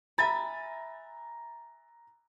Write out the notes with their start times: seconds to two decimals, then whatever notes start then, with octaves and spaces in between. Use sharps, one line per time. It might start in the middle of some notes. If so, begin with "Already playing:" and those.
0.18 E5 G#5 A#5 B5 A6